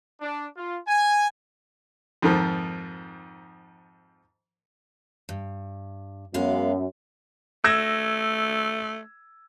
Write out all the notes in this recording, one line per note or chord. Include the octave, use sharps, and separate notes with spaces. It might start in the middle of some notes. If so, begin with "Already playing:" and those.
D4
F4
G#5
F2 G#2 D#3 F3
G2
F#2 G#3 B3 F5
A3 E6 G#6 A#6